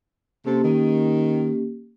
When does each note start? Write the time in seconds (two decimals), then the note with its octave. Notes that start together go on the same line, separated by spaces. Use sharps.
0.45 C3 A#3 C4 C#4 G4 A4
0.64 D#3